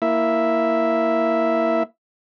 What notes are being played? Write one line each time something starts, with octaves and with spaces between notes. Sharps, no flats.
A#3 E4 E5